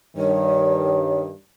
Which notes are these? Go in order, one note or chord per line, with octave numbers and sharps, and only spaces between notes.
G2 D#3 C#5